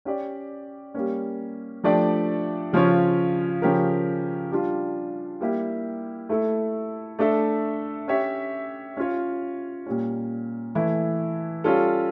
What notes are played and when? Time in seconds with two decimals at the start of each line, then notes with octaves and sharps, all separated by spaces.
0.05 C#4 G4 D5
0.94 G3 A#3 C#4
1.84 F3 A3 D4 G4 D5
2.73 C#3 F3 C#4 F4 C#5
3.62 C#3 F3 C#4 G4 A#4
4.51 G3 D4 F4
5.40 G3 A#3 E4 G4
6.29 A3 E4 A4
7.19 A3 D4 A4 E5
8.08 C#4 G4 C#5 E5
8.97 C#4 F4 C#5
9.86 A#2 G3 C#4
10.75 E3 A3 E4
11.64 G3 C#4 F4 A4